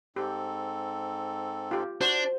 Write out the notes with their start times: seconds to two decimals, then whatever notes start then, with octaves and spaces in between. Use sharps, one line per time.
0.16 G#2 C4 G4 A4
1.71 F4 G4
2.01 D4 F#4 C5